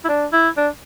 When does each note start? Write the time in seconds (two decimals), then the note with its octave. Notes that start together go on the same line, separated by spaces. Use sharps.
0.04 E4
0.09 D4
0.33 E4
0.57 D4